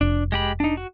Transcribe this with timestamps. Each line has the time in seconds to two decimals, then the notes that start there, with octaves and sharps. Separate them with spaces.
0.01 F1 D4
0.32 G#3 G4 B5
0.60 D4 D#4
0.77 F#4